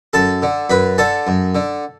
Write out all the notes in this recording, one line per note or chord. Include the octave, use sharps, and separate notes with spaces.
F#2 A4 A5
D3
F#2 B4 B5
D3 A4 A5
F#2
D3